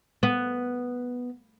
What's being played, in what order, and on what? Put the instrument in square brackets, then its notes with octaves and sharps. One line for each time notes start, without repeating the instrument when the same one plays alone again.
[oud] B3